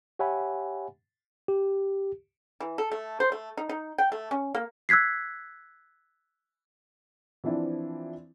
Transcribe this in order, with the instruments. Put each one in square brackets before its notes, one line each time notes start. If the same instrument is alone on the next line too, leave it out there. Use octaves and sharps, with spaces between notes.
[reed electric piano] G4 C#5 E5 F#5 G#5 B5
[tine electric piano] G4
[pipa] E3
A4
A3
C5
A3
D#4
D#4
G5
A3
C#4
A#3
[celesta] E6 F#6 G#6 B6 C7
[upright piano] E3 F3 C4 D4 E4